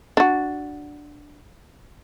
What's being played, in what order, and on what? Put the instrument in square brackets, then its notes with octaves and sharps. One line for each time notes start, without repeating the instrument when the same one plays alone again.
[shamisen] D4 F#4